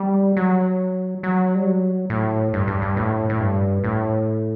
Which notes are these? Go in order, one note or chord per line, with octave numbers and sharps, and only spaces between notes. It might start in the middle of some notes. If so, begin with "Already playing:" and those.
Already playing: G3
F#3
F#3
G3
F#3
A2
G2
G2
G2
A2
A2
G2
A2